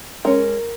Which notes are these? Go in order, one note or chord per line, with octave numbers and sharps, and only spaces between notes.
G#3 C#4 A#4